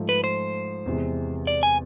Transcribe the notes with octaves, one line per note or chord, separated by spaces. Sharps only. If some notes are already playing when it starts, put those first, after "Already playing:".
Already playing: G#2 F3 A3
B4
C5
E2 C3 G#3
D5
G#5